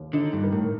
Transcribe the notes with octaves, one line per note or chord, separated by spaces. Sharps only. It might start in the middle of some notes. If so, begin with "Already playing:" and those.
Already playing: D#2
D3 D#4
G2
A#4
A2